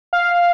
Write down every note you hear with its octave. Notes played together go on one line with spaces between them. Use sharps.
F5